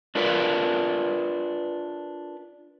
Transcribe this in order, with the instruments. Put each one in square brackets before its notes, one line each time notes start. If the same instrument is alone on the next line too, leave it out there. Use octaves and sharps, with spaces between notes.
[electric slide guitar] D4 F4 A#4 B4 D5